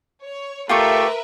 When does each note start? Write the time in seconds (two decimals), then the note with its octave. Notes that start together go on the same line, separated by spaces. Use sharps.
0.22 C#5
0.69 A3 F4 G4 A#4 B4 E5 C#6